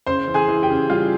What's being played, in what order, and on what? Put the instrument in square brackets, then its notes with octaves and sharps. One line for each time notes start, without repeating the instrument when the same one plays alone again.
[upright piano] C#3 C5 C6
E3
G#4 G#5
E3
G4 G5
C#3
G3 F4 F5